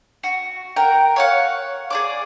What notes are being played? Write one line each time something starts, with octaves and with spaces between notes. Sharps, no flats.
F#4
A#4 F#5 G5 A#5
C#5 F5 F#5
G#4 D5 D6